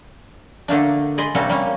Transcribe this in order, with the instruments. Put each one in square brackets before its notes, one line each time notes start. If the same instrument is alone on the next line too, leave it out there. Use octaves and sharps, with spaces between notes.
[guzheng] D3 A3 A#3 D4
D5 D#5 G#5 B5 C6
C3 G3 A#3 C#4 F#4 A4
G3 A#3 C#4